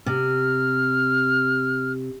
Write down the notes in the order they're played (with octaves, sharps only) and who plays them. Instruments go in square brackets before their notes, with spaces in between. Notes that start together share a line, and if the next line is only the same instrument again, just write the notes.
[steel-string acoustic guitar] C3 [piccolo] F6